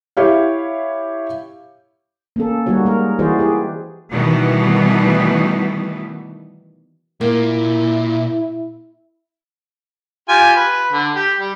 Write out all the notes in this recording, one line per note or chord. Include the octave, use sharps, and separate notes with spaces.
E4 G4 C#5 F5
A#3 C#4 A4
G3 A#3 D#4 F#4 C#5
G#3 A#4
E3 E4 F#4 G#4 C5 D5
G4 G#4 B4
B2 D#3 E3 G3 A3 B3
A#2 A#3 E4
F4 G4 G#5
B4
D3
G4
G3